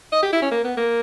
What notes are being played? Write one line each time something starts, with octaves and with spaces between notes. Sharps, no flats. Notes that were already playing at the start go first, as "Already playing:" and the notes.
D#5
G4
E4
C#4
A#3
B3
A#3